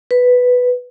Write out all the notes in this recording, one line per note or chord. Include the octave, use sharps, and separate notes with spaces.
B4